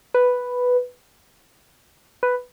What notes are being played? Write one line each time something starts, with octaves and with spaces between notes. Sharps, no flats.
B4
B4